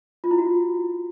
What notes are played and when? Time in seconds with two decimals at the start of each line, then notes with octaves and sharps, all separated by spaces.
0.24 F4
0.31 E4
0.38 F#4
0.46 F4